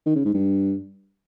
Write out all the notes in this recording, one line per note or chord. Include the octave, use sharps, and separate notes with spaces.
D#3
C#3
G#2
G2